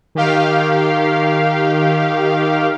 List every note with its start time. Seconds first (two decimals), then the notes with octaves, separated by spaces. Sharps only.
0.15 D#3 G4 F5